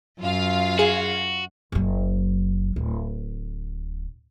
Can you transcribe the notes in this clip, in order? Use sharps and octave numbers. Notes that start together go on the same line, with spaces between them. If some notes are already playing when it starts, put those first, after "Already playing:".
F#2 F4 F5
F#4 G#4
F#1 F#3
D1